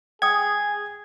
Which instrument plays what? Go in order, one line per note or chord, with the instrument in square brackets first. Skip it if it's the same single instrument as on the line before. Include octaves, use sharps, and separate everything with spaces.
[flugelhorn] G#4 [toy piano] G5 D#6 [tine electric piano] G#6